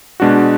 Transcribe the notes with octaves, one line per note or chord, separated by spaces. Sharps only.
B2 G#3 D4 F#4